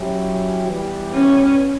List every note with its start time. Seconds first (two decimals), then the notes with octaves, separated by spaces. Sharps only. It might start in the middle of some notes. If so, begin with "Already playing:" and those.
Already playing: F#3 C#4 E4 G4
0.66 E3 G3 B3
1.13 C#4